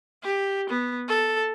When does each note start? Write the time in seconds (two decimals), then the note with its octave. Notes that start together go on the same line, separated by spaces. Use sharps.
0.23 G4
0.70 B3
1.08 A4